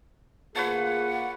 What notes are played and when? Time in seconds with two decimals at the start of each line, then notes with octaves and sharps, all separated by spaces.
0.56 D2 A#3 F4 G#4 B4 C#5 F#5 A5